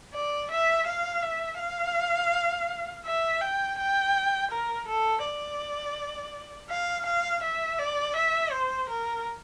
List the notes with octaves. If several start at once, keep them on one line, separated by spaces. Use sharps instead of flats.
D5
E5
F5
E5
F5
E5
G5
G5
A#4
A4
D5
F5
F5
E5
D5
E5
C5
A#4